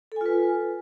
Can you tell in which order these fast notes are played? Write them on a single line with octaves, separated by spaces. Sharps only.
A4 G#5 F4 B4